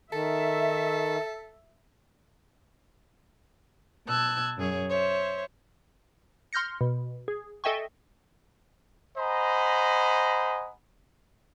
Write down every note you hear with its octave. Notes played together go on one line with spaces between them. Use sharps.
D#3 A4 E5
B2 A5 E6 F#6 G#6
F#2 G#4 C#5
C5 C#5 E5
C6 F6 G6 A#6 C#7
B2
G#4
A4 D#5 E5 G5 G#5 C#6
C5 D#5 F#5 G#5 A#5 B5